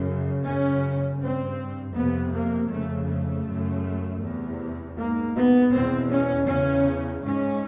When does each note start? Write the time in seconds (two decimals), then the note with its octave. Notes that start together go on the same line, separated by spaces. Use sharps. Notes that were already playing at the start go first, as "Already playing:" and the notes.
Already playing: F#2 C#3
0.44 F#2 C#3 C#4
1.20 G2 C4
1.95 F2 C3 B3
2.33 A#3
2.71 F2 C#3 A3
3.08 A3
3.46 F#2 C#3
4.22 E2 C3
4.97 G#2 A#3
5.35 B3
5.73 E2 B2 C4
6.11 C#4
6.48 E2 C#3 C#4
7.24 G#2 C#4